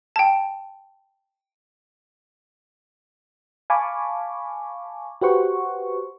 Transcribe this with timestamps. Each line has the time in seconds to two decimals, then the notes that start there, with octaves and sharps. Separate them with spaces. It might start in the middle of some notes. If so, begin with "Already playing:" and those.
0.16 G5 A5
3.70 F5 G#5 A5 B5 C#6 D6
5.21 F#4 G4 B4 C5 F#5 C#6